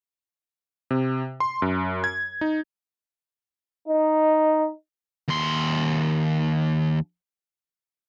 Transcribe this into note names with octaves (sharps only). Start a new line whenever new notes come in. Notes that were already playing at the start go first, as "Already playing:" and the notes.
C3
C6
F#2
G#6
D#4
D#4
D#2 C6